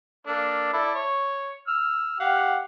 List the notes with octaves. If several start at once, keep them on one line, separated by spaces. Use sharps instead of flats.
A#3 D4 A4
E4 A4 D5
C#5
E6 F6
G4 F5 F#5